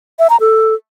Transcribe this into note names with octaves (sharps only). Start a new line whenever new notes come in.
E5
A#5
A4